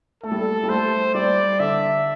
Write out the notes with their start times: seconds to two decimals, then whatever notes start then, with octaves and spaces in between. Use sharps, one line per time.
0.23 A3 A4
0.32 G3
0.39 A3
0.64 G3
0.69 A3 C5
1.14 G3 D5
1.59 D3 E5